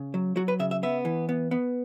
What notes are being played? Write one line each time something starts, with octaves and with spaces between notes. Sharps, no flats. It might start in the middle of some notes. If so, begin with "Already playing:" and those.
Already playing: C#3
F#3
F#3 F#4
B4
C#3 E5
E5
B3 E5
E3
B3
B3